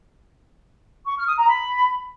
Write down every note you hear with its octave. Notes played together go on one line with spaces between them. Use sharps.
C#6
F6
D#6
A#5
B5